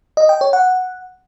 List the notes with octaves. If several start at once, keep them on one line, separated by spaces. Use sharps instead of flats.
D#5
G5
C#5
F#5